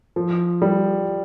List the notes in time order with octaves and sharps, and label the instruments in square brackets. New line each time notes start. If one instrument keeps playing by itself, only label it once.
[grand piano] F3
G3